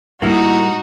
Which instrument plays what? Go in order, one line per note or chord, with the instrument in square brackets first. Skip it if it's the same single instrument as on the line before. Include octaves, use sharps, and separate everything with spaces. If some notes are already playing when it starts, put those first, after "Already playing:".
[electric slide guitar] A2 G3 [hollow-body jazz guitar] A#3 E4 [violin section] D#4 F#4